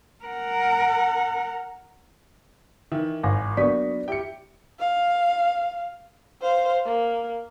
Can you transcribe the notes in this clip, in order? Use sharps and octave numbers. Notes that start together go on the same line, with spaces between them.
A#4 F#5
D#3 E3 E5
G#1 G#5 A#6
F#3 A#3 B3 D4 D5 C#6 D#6 B6
E4 G4 G5 C#7
F5
C5 F5
A#3